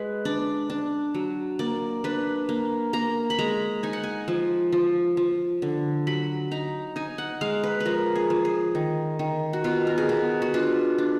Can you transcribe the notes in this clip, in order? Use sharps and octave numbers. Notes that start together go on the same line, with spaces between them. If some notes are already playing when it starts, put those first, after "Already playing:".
Already playing: G#3 B4
D4 D5
D4
F#3
A#3 D5
D4 B4
A#3
A#3 A#5
B5
G#3 A#5
D#4 G#5
F#5
G#5
F3
F3
F3
D3
F#3 B5
D#4 A#5
D#4 G#5
F#5
G#3 F5
B4
B4
F3 A#4
G#4
F3
G#4
D#3
D#3
F#4
B2 F4
A#4
G#4
B2 F#4
F#4
D4 F4
D4